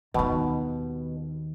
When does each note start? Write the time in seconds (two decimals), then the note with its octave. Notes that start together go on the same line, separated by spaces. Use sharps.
0.14 D#2 B2 D#3